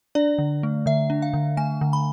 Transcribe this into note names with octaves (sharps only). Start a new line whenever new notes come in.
D4 D5
D3
A3
D3 E5
D4
F5
D3
A3 G#5
D3
B5